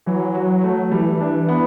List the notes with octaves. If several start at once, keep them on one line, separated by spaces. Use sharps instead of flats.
E3 F#3
F#4
A3
E3 G3
D4
B3